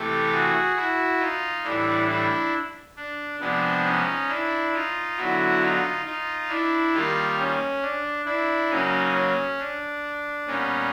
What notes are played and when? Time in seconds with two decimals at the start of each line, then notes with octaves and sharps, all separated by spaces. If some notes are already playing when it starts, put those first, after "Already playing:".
Already playing: C3 E3 A3 G4 A4
0.31 F#4 G#4
0.76 E4 F#4
1.20 D#4 F4
1.64 A2 E3 G3 D4 E4
2.08 D4 E4
2.97 D4
3.40 C3 F3 G#3 B3 D4
3.84 C#4 D#4
4.28 D4 E4
4.73 D#4 F4
5.17 D3 F#3 B3 E4 F#4
5.61 D#4 F4
6.05 D#4 F4
6.49 D4 E4
6.93 D#3 G3 A#3 F4 G4
7.38 C#4
7.82 D4
8.26 D4 E4
8.70 C#3 F#3 A#3 C#4 D#4
9.14 C#4
9.59 D4
10.47 A#2 G3 B3 C#4 D#4